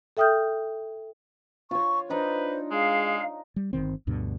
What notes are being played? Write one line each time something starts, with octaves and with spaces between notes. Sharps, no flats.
A4 E5 G5 D#6 F6 G6
F4 C#5 C#6
D4 D#4 B4 C5 D5
G#3 G#4 F5
G3
G1 C2 D#3 C4
D2 G2 B2 D3